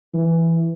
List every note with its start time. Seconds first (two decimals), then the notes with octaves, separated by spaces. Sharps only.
0.14 E3